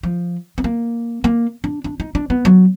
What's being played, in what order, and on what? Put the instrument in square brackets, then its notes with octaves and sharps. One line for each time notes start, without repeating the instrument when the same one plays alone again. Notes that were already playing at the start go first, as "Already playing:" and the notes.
[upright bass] F3
B3
A#3
A#3
D4
D4
D#4
D4
B3
F#3